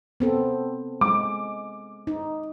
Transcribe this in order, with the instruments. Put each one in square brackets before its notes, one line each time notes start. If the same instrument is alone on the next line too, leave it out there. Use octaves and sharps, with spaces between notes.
[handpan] B3 C4 A4
[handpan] G#3 [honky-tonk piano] D6
[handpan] D#4